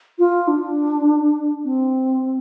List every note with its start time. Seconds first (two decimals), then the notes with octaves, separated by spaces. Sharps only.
0.19 F4
0.48 D4
1.64 C4